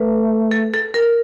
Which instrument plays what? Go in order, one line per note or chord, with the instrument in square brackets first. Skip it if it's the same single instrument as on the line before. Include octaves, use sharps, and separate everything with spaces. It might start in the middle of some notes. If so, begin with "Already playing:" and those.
Already playing: [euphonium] A3 [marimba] B4
[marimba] A4
A4
A#4